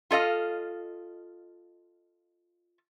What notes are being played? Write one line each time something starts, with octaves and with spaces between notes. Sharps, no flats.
F4 A4 D#5 F5